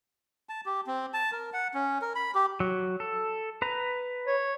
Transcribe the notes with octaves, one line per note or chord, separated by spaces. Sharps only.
A5
G4
C4
A5
A#4
F#5
C#4
A#4
B5
G4
F#3
A4
B4 A#5
C#5